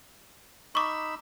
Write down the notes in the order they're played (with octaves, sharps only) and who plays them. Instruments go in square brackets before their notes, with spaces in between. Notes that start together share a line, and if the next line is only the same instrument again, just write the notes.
[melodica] D#4 B5 E6 [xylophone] C#6 D6